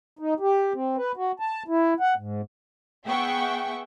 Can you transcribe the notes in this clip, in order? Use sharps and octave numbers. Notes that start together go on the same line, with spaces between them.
D#4
G4
C4
B4
F#4
A5
E4
F#5
G#2
B3 G#4 E5 F#5 G5 C#6